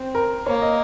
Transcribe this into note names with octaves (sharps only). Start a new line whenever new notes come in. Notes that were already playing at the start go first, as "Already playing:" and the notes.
Already playing: C4
A#4
A#3 C#5
D#5